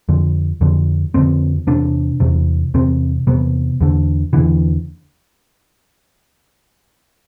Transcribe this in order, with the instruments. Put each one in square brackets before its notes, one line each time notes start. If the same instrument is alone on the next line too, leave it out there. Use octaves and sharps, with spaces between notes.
[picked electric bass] F2 D3
F2 D3
F2 D3 C4
E2 C3 D4
E2 C3
E2 C3 C4
E2 C3 B3
E2 D3
E2 D3 E3